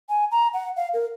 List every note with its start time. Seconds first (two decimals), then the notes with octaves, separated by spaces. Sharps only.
0.09 G#5
0.31 A#5
0.54 F#5
0.76 F5
0.94 A#4